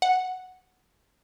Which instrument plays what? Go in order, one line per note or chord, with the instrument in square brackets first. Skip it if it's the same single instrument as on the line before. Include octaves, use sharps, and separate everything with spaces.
[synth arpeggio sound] F#5